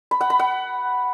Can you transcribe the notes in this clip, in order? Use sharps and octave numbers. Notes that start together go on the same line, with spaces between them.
B5
F#5
B5
F#5